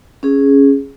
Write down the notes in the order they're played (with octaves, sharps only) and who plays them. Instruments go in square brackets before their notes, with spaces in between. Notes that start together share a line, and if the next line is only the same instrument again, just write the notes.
[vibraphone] C#4 G#4